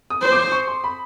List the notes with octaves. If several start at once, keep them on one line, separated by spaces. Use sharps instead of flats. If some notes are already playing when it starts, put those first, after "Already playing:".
D#6
C5
D6
C#6
C6
B5